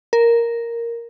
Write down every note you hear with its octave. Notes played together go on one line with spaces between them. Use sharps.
A#4